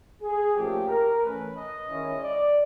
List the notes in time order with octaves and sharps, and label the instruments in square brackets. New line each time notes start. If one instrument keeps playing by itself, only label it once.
[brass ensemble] G#4
A#2 F3 A3 C#4 G4
A#4
E3 A3 C#4 B4
D#5
D#3 G#3 C#4 E4
D5